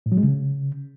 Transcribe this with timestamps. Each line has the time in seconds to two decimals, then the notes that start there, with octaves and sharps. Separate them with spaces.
0.06 A2
0.12 F#3
0.17 G#3
0.23 C#3